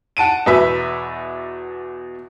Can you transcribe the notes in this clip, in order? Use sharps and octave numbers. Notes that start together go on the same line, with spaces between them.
F#5 A5 D7 D#7
E2 B2 B4 E5